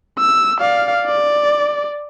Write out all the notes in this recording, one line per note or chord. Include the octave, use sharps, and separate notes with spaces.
E6
D5 F5
D5